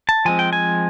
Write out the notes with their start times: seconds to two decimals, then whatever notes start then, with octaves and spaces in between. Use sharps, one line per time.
0.09 A5
0.25 F3 G#3 C4 G#5
0.39 G5
0.53 G#5